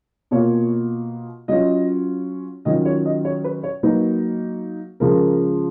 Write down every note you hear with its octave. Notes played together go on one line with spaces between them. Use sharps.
B2 A#3 F4 C#5
F#3 C#4 F4 D#5
D#3 F#3 C#4 F4 D#5
C#5
D#5
C#5
B4
C#5
F#3 A#3 D#4 B4
C#3 F3 G#3 A#4